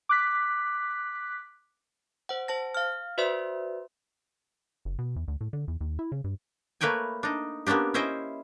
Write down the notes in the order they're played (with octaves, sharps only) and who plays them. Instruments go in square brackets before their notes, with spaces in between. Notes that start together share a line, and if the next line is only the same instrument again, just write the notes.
[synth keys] D6 F#6 B6
[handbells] C5 F#5
C5 A5 A#6
F5 F6
F#4 B4 C5 D5 E5 C6
[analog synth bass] F#1
B2
E2
D2
A2
D3
E2
D#2
E4
C#3
G2
[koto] A3 A#3 B4 C#5 G5 G#5
D4 D#4
A#3 B3 C#4 D4 G4
C#4 E4 C5 D#5 E5 G5